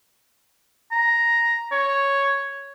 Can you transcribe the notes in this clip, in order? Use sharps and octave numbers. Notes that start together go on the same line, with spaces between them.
A#5
C#5